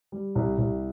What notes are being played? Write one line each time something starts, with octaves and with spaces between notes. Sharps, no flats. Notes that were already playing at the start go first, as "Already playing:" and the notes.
G3
C2
C2